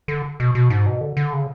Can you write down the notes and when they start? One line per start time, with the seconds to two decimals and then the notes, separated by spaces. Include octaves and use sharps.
0.08 D3
0.40 B2
0.55 B2
0.70 G#2
0.86 B2
1.01 D3
1.17 D3
1.33 C#3